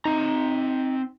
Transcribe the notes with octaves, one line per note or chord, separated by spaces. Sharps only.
C4 D#4 A#5